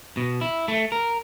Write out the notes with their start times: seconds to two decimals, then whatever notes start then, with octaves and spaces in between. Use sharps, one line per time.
0.17 B2
0.41 E4
0.68 A3
0.92 A#4